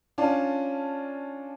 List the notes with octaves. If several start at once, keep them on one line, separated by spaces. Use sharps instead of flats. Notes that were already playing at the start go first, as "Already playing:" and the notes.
C#4 D4 F4 D5 A5